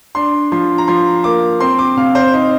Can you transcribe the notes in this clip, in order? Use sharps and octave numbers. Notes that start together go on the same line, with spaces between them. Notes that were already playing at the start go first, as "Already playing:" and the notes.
D4 C6
F3 C6
A#5
F3 C6
A#3 D6
C4 C6
D6
C3 F5
C5
D#4 C5